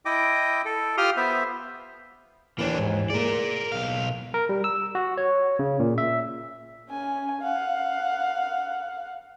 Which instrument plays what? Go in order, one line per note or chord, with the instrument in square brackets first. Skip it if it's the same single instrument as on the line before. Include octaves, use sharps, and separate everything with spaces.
[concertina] E4 D#5 G5 D6
A4
F4 G4 C6 D#6 F6
B3 C5 E5
[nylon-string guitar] D#2 E3 [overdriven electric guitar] A#3 D4
[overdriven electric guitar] G#2
[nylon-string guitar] A#3 G#4 [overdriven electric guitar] A#4 D5
[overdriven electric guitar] B1 F5
[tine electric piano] A#4
G3
E6
F#4
C#5
C#3
A#2
E5
[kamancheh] C#4 G#5
F5 F#5